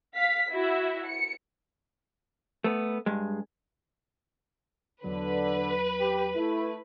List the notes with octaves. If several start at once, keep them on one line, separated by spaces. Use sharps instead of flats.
F5 B6
E4 F#4 E5
C#7
A3 B3
G2 G#3
E2 D3 F#3 B4
G4
A3 E4